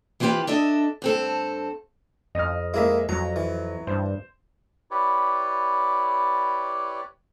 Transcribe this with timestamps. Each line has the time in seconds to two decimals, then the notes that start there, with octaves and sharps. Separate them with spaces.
0.20 E3 B3 C4 F4 G4 B4
0.47 D4 A4 D#5 E5
1.02 G2 C4 A4
2.35 F2 D#5 F6
2.74 G#3 A#3 E4 D#5 E5
3.09 F2 F#3 A#5
3.36 E3
3.87 G2 C5
4.91 E4 G4 B4 C#5 D5